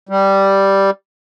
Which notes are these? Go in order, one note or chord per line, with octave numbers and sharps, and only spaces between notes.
G3